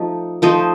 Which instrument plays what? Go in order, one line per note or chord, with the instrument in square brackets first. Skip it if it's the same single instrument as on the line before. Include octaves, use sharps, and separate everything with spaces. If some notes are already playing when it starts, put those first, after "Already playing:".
Already playing: [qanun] F3 A3 D#4
F3 A3 D#4 C5 D#5